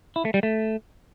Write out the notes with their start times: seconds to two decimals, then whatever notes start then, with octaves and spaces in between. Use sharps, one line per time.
0.16 E4
0.25 A3
0.34 G3
0.43 A3